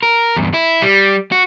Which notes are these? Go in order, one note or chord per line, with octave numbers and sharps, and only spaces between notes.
A#4
E2 G2
E4
G3
F#4